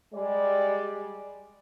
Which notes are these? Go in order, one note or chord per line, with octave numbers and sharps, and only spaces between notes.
G3 G#3 D5